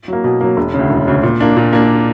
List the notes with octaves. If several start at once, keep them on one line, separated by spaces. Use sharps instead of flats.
F#3 A#3
B2
F#3 A#3
E1
C#3
D2
E1
D2 C#3
A#2
A#3 D4
A#2
A#3 D4